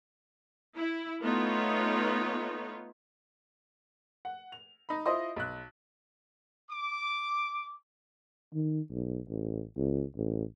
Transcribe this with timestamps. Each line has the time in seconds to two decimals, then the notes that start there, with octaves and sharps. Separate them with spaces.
0.77 E4
1.22 A3 B3 D#4 F4 B4 C#5
4.25 F#5
4.52 F7
4.89 D#4 B5
5.06 E4 F4 C5 D#5 C6 D#6
5.36 B1 F#6
6.71 D6
8.54 D#3
8.90 B1
9.29 A1
9.77 C#2
10.17 A1